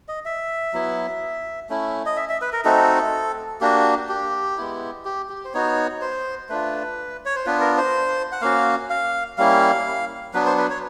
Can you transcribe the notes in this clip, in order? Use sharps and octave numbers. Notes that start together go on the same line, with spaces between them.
D#5
E5
F#3 B3 E4
A3 C#4 E4
D#5
E5
E5
B4
A#4
A3 C4 D#4 F#4 A4
A#3 D4 F#4 G4
G4
G#3 B3 E4
G4
G4
C5
B3 D#4 F#4 C#5
C5
A3 D4 F4 B4
C#5
C5
B3 D4 F4 B4
A#4
C5
F#5
A#3 C#4 F#4 F5
F5
G3 A#3 C#4 E4 F5
F#3 B3 D4 B4
C5
B4
C#5